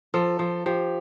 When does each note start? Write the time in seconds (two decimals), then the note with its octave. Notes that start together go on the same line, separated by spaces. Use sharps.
0.14 F3 A4
0.39 F3
0.66 F3 G4